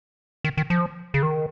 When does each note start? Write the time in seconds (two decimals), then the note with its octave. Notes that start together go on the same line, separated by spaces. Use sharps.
0.44 D#3
0.57 D#3
0.70 F3
1.14 C#3
1.23 D#3